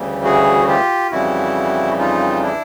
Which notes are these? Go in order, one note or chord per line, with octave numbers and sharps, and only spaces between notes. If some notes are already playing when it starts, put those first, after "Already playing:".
Already playing: D2 C#3 E3 G3
F#4 G#4
F4 G4
F2 C#3 E3 G3 E4 F#4
D#4 F4
D4 E4